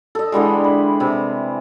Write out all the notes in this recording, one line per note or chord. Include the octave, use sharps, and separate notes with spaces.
A4 D#5
D3 E3 G3 G#3
B4
C3